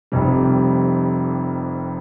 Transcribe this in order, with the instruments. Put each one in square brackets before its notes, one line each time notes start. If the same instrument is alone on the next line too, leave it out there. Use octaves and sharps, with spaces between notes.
[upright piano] F1 F2 C3 G3